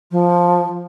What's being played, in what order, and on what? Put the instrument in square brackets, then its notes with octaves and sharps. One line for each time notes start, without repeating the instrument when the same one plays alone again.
[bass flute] F3